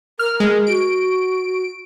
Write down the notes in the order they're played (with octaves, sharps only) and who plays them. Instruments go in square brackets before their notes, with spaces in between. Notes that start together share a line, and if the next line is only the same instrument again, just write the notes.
[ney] A#4 [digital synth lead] F6
[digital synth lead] G#3
[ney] F#4 [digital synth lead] D7